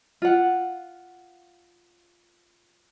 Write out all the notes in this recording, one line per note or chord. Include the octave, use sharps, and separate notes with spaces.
F4 F#5